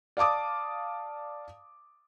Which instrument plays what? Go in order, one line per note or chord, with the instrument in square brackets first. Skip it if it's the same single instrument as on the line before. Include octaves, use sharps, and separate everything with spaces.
[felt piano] D5 F5 A5 D6 D#6